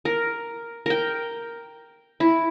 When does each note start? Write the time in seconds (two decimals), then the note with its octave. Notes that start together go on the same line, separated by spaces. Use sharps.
0.05 A#4
0.86 A#4 G5
2.20 E4